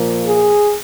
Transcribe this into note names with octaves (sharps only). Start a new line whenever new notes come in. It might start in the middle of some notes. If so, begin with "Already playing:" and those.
Already playing: A#2 F3 A#3
G#4